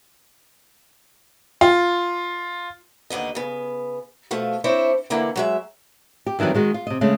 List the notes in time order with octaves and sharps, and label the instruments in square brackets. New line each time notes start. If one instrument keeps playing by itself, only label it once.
[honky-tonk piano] F4
[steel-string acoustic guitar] D#2 D3 B3 D#5
C#3 B3
B2 F3 A3 F4
C4 D4 E4 C5 C#5
D3 E3 A#3 E4 F#5
F#3 G#3 E5
[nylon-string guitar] G4
F2 D#3 E3 F#3 G3
D#3 G#3 F#4
F4
C3 D#5
C#3 G#3 A3 C#4